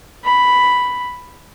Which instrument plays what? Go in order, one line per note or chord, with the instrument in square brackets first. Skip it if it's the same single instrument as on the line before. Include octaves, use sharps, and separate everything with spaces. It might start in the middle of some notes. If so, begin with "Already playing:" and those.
[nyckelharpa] B5